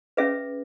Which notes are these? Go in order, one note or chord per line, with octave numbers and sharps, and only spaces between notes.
C#4 G#4 B4 E5